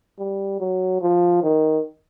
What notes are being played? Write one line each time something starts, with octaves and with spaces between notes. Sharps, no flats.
G3
F#3
F3
D#3